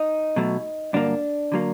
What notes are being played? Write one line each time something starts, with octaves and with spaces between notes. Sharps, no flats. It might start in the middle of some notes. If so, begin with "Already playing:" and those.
Already playing: D#4
B2 F#3 A3
G2 D3 F#3 A#3 D4
D3 F#3 A#3